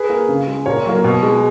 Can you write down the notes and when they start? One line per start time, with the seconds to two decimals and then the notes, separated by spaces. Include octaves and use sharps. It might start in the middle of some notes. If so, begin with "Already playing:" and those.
Already playing: G#4 B4
0.10 A#3
0.29 C#3
0.47 G#3
0.66 A#2 A#4 C#5
0.86 F#3 A#3
1.04 B2
1.23 G#3